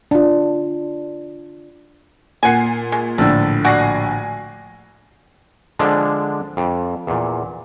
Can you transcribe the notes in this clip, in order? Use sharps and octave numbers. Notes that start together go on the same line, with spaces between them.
D4 F4
A#2 F#5 G#5 C7
G#3
A#1 A2 D3 A4
F#4 D5 F#5 G#5 A#6 C7
D3 F3 G#3 D4
F2
E2 A#2